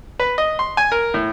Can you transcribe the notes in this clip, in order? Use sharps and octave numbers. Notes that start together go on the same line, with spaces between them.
B4
D#5
C6
G#5
A#4
A2